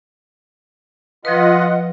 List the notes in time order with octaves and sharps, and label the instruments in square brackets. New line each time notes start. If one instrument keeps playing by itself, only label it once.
[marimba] F3 B4 [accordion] F4 D#5 F#5